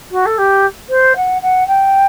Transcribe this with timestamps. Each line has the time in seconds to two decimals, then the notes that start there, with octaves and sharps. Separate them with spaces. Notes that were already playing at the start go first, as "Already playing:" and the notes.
0.11 F#4
0.25 A4
0.37 G4
0.89 C5
1.16 F#5
1.41 F#5
1.67 G5